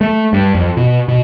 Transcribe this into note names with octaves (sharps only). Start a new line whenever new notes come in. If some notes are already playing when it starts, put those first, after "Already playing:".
A3
G2
F2
B2
B2